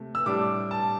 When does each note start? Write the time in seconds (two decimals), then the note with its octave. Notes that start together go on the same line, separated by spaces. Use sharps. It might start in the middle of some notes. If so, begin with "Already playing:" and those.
Already playing: C3 A3
0.15 E6
0.26 A2 G3 D4 D6
0.71 A5